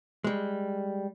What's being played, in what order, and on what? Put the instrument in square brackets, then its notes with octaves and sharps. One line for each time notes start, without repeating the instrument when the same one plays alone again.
[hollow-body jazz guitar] G3 G#3